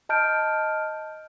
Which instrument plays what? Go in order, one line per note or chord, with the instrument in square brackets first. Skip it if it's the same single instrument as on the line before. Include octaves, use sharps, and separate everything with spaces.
[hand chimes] D#5 A5 F6 G6 D7